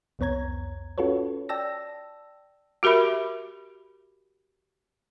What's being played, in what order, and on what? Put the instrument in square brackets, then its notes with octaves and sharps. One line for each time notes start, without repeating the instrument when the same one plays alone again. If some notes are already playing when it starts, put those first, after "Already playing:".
[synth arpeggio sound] C2 F2 B3 C#5 A#5 G#6
C#4 F4 F#4 A4 B4 C#5
D5 G5 A5 E6 A#6
[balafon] F#4 G4 A#4 E5 B5